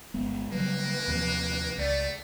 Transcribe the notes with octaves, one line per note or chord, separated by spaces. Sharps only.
G1 G#3 B3
C#3 F#3 G3 A#3 B4
D#2 C3 F3
C#2 A3 D5